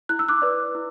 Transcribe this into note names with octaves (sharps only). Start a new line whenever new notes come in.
E4 F#6
E6
D6 F#6
B4 D5
E4